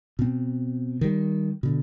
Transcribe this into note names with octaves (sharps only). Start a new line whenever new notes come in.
B2 C4
D#3 G3
B2 D3